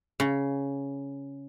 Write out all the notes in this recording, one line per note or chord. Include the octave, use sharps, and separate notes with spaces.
C#3